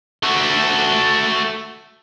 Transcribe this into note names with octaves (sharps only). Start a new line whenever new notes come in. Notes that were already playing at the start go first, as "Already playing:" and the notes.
A3 F#4